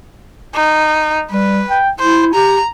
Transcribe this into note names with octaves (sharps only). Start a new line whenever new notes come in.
D#4
G3 B4
G5
E4 C5
G4 A#5